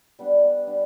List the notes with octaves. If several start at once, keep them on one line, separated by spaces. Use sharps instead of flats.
G3 B3 D4
G3 B3 D4